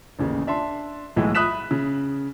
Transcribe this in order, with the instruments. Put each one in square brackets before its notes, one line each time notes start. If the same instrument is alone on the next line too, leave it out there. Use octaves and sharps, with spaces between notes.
[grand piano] A1 D#2 C#3
D4 E5 A5 C6
B1 A2 E3 G#3 B3
E5 B5 D#6 F#6 B6 E7
C#3